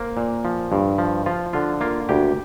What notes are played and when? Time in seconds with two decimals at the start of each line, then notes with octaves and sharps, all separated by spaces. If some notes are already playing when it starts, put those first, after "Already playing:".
Already playing: A#3 C5
0.17 A#2
0.45 F3
0.72 G2
0.98 F3
1.26 F3 F4
1.53 D3 F4
1.81 A#3 F4
2.09 D2 G4